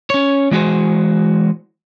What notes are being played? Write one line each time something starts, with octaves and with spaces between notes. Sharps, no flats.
C#4 C#5
E3 G#3 F#4 G#4 C5